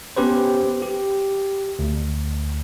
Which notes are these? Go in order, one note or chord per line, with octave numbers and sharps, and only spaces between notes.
B3 C#4 G4 B4 C5
G4
D2